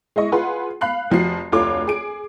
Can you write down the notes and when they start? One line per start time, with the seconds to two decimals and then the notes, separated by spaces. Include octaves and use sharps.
0.16 G#3 E4 D#5 C#6
0.32 F4 G#4 B4 F#5 C6
0.81 F5 B5 F#6 C7
1.10 F1 F3 F#4 C7
1.52 F1 D2 F4 A4 C#5 D6
1.87 G#4 D7